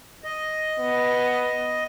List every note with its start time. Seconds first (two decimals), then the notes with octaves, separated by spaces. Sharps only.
0.24 D#5
0.79 B3